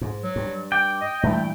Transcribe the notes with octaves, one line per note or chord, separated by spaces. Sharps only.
G#2
F#3
G2
G5 D6
D#5
G2 A#2 E3 A3